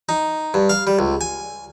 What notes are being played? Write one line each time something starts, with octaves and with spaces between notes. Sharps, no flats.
D#4
G2
F5
G3
C#2
G#5